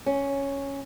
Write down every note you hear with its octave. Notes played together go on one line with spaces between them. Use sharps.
C#4